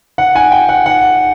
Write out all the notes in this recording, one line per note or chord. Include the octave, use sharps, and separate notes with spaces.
F#5
F#5 G#5
G5
F#5
F#5